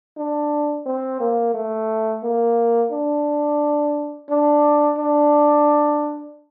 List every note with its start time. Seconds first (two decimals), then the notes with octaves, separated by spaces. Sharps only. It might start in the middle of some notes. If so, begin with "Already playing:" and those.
0.17 D4
0.86 C4
1.20 A#3
1.54 A3
2.23 A#3
2.92 D4
4.29 D4
4.97 D4